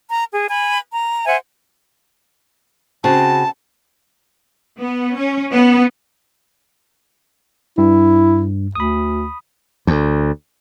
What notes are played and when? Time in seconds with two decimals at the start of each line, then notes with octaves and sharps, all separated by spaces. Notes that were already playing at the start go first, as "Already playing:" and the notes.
0.09 A#5
0.33 G#4
0.50 G#5 B5
0.91 A#5
1.25 C5 E5 F#5 G#5
3.04 C#3 C4 F#4 A5
4.79 B3
5.16 C#4
5.51 B3
7.78 G2 E4
8.75 D2 B5 D#6
9.87 D2